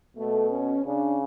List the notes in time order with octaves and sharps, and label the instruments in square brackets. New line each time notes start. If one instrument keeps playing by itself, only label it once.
[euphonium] B2 [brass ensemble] A3
[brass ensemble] C#4
[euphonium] C#3 [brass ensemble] D4